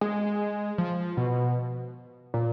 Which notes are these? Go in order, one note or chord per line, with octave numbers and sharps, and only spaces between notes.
G#3
F3
B2
A#2